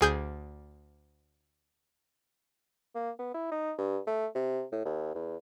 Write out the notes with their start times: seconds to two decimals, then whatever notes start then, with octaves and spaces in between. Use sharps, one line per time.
0.01 D2 G#4 G6
2.95 A#3
3.19 B3
3.34 E4
3.52 D#4
3.78 G2
4.07 A3
4.35 C3
4.72 A2
4.85 D#2
5.15 E2